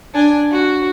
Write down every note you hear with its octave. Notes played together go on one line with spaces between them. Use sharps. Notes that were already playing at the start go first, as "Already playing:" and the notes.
D4 G#5
F#4